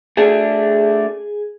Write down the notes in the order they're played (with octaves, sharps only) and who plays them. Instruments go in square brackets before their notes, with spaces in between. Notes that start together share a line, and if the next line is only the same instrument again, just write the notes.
[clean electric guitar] A3 D4 [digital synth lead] G#4